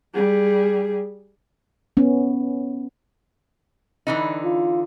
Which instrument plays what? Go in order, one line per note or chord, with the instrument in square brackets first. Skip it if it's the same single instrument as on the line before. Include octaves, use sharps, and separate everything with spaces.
[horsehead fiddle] G3 G#4
[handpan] B3 C#4
[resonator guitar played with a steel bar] D3 E3 D#4
[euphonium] F4